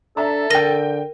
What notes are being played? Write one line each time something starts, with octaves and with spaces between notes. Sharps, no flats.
D4 A4 E5 A#5
D3 A#4 G5 A#6 D#7